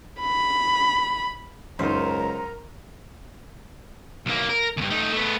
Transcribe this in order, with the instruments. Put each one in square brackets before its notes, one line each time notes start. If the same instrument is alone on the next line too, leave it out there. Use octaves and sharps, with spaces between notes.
[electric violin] B5
[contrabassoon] C#2 [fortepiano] F#2 D#4 [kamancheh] A#4 A#5 [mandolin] C5
[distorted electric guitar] B1 A#3
A#4
D2 G2
A3 D#4
A3 B3